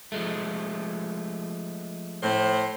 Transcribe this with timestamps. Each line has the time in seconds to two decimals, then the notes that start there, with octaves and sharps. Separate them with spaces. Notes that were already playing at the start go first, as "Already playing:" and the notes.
0.12 F3 G#3 A3
2.22 A2 C5